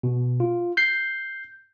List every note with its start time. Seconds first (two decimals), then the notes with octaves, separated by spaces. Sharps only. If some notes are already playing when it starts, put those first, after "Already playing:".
0.03 B2
0.40 F4
0.77 G6 C7